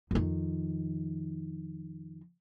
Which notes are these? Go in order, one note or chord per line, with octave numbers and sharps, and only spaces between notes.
F2 D#3